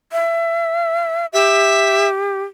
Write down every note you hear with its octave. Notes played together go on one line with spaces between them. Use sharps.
E5
G4 E5